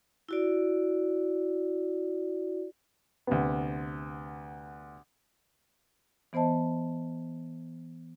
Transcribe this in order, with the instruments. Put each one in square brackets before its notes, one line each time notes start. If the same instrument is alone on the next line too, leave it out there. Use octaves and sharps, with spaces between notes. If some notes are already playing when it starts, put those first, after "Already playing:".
[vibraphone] E4 F#4 D5
[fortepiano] D2 C3 B3
[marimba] E3 B3 C5 D#5 A5